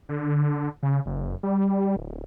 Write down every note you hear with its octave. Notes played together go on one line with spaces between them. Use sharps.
D3
C#3
F#1
G3
D1